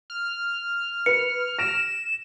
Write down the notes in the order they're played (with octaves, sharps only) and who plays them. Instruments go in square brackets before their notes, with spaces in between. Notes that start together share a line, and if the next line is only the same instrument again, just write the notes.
[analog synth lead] F6
[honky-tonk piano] B4 [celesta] C#7
[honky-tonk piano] A#6 D7 [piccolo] E7